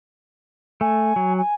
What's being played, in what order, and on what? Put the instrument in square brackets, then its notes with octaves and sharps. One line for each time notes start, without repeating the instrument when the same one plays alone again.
[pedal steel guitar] A3 [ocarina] G#5
[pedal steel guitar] F#3
[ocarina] G#5